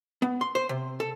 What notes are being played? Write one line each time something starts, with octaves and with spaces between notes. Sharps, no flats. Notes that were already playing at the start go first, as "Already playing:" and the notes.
B3
C6
C5
C3
A4